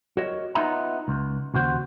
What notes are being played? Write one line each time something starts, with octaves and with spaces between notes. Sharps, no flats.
F#4 A#4 C#5 D#5
B3 D#4 F4 D#5 E5 A#5
C#2
D#2 C#3 F#4 C5